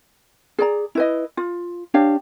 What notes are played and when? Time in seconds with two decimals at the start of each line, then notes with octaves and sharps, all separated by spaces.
0.59 G#4 D5 A#5
0.95 E4 B4 D#5
1.37 F4
1.94 D4 G4 C#5 F5